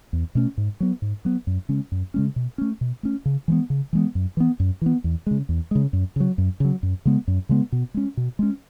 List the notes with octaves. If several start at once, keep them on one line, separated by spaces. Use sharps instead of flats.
E2
B2 A3 C#4
G#2
F#3 B3
G#2
F#3 B3
F#2
C#3 G#3 C#4
F#2
C#3 G#3 C#4
B2
A3 C#4
B2
A3 C#4
C#3
E3 G#3 B3
C#3
E3 G#3 B3
F#2
E3 B3
F#2
E3 B3
E2
C#3 G#3
E2
C#3 G#3
F#2
C#3 F#3
F#2
C#3 F#3
F#2
C#3 G#3 B3
F#2
C#3 G#3 B3
B2
G#3 C#4
B2
G#3 C#4